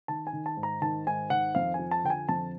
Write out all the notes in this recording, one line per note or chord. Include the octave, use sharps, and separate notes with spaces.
D#3 A5
G#5
D#3
A5
G#2
A#5
D#3 A5
G#2 G#5
D#3 F#5
F2 F5
F3 G#5
A5
D3 G5
G#5
F2 A5